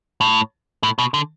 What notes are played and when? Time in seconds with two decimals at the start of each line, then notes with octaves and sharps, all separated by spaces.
0.21 A2
0.83 A2
0.99 B2
1.14 D3